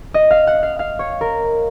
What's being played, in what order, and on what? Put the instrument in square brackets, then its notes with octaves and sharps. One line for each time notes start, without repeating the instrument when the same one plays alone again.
[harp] D#5
F5
F#5
F5
F5
C#5
A#4